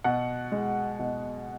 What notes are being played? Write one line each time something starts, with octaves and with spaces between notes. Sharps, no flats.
B2 F#5
G#3
B2